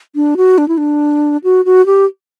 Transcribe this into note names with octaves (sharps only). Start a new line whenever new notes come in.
D4
F#4
D4
E4
D4
F#4
F#4
G4